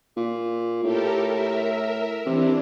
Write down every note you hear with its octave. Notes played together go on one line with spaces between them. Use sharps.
A#2
A2 G4 A4 A#4
A#4 E5
C3 E3 D4